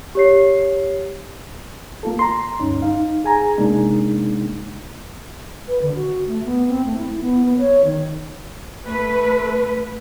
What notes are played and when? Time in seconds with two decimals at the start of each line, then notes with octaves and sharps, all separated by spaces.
0.15 G4 C#5 C7
2.03 A#3 F4 A4
2.19 A#5 C6
2.60 D2 G2 C#4 D#4
2.82 D#4 F5
3.24 G#4 G#5 A#5
3.58 C3 G#3 A#3 D4 D#4
5.67 B4
5.82 D3
5.95 F#4
6.28 A3
6.44 B3
6.69 C4
6.85 A3
6.97 E4
7.21 B3
7.46 B3
7.59 C#5
7.85 D#3
8.86 A3 B4